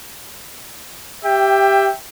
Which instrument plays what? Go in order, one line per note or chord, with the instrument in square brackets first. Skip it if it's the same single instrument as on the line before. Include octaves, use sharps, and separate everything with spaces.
[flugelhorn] G4 [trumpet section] E5 G5